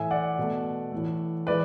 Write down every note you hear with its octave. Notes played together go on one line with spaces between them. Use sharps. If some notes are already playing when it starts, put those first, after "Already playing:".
Already playing: A2 E3 A3 E5 G#5
D5 F#5
B2 A3
A2 E3 A3
E3 G#3 B4 D5